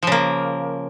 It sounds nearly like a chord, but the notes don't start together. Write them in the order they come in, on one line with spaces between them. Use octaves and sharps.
F3 C#3 A#3